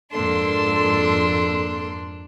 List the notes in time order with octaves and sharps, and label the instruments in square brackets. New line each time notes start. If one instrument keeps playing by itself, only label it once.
[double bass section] F2 G#2 [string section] A#3 C6 [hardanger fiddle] D4 [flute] A4